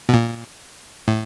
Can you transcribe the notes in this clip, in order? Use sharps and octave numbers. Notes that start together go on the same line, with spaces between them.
B2
A#2
A2